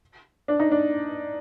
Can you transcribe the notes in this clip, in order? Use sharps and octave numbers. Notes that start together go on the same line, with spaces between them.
D4
D#4
D4